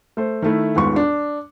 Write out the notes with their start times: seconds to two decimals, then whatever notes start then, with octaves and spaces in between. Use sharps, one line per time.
0.17 A3 C5
0.42 D#3 A3 E4
0.76 D#1 D#2 G#2 B3 F4 C#6
0.96 D4